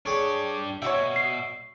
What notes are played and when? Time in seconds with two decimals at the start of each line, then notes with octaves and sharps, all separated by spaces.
0.06 D4 G4 G#4 C#5
0.82 B2 G3 F#4 C#5 E5
1.16 C7